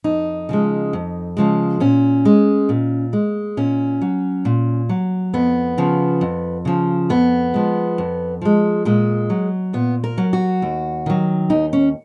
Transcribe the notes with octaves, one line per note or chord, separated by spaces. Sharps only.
F2 D#4
C#3 F3 G#3
F2
C#3 F3 G#3
A#2 C#4
G#3
A#2
G#3
A#2 C#4
F#3
A#2
F#3
F2 B3
C#3 F3
F2
C#3 F3
F2 B3
F3 G#3
F2
F3 G#3
A#2 G#3
F#3
A#2 B3
A#4
F#3
F#4
D#2
D#3 F#3
D#2 D#4
C#4